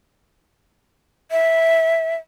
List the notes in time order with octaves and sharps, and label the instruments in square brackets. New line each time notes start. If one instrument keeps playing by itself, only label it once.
[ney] E5